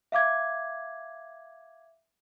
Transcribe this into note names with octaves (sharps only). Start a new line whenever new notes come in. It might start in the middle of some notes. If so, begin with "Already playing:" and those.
E5 F5 D6 G#6